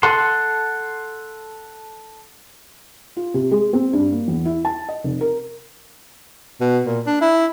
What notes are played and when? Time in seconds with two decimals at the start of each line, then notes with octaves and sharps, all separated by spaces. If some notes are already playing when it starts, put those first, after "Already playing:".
0.03 A4 F#5 C6
3.17 F4
3.34 C3
3.51 G#3
3.73 C4
3.93 G2
4.12 A#3
4.28 E2
4.45 E4
4.65 A5
4.89 D#5
5.04 F1
5.21 A#4
6.60 B2
6.84 A#2
7.06 D4
7.21 E4